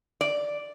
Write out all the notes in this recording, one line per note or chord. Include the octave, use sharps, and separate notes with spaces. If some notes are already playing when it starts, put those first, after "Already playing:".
D5